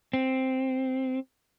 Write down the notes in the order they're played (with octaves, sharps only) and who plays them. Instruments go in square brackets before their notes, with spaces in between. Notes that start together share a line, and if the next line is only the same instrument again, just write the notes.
[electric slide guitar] C4